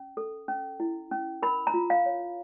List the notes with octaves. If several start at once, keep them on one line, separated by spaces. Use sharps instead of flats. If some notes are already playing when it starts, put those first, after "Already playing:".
Already playing: C#4
A4
C#4
E4
C#4
A#4 B5
A#5
F4
F5
C#5